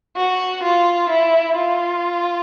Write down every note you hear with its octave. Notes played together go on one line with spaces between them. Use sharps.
F#4
F4
E4
F4